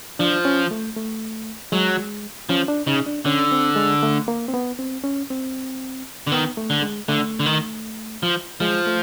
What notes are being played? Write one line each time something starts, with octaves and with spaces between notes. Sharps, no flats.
F3 D4
C#4
A3
A3
F#3 G#3
F3 C#4
D4
C#3 D#4
D4
D3 C#4
C4
G#3
A3
A#3
C4
B3
C4
C#4
C4
D3
D#3 B3
A3
D3
G#3
D3 A3
D3
D#3
F3
F3 G#3
A3